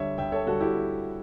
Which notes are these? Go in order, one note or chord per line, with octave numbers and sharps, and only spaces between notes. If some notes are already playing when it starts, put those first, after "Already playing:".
Already playing: D2 D3 G3 C#5 E5
D2 E5 G5
A4 C#5
D3 G3 F#4 A4
E4 G4